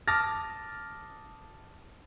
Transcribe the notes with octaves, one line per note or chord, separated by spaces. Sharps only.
A5 D6 D#6 F6 A6 A#6